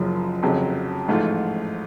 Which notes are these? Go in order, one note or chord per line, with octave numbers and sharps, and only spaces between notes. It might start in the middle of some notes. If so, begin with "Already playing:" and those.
Already playing: F#1 F#2 C#3 F3
F1 F2 C#3 F#3
A1 G#2 F3 A3 F4